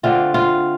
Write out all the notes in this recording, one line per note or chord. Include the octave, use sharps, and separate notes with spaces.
D3 A3 C4 F4
F4